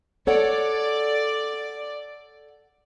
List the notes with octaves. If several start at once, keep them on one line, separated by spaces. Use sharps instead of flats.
A4 C#5 D5 F#5